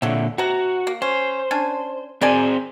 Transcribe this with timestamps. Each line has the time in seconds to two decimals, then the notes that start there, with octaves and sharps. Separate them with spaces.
0.02 A#2 D3 F#3 E5
0.38 C3 F#4 A#5
0.87 A#3
1.02 C#4 C5
1.51 C#4 D4 G#5
2.21 C4 G#4 A#4 C5 D5 G#5